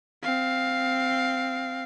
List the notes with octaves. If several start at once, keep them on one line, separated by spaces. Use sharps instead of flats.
C4 F5